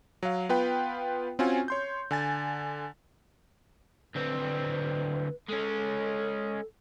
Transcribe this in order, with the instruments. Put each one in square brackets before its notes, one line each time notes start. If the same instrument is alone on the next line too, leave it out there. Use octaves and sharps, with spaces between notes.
[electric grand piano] F#3 F5
B3 F4 B4 G5
C4 C#4 F4 F#4 G#5
C#5 C6 G6
D3 G#5 A6
[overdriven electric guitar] D2 C4 [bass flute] B4
[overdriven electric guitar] G#3 C#4 [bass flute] A4